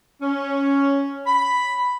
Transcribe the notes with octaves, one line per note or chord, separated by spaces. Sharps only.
C#4
B5